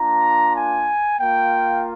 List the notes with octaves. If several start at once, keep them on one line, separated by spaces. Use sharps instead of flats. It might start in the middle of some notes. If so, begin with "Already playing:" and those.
Already playing: A#3 D4 F4 A#5
G#5
A#3 F4 G5